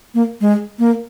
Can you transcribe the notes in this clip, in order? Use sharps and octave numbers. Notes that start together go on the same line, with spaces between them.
A#3
G#3
A#3